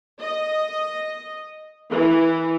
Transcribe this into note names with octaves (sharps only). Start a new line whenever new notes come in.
D#5
E3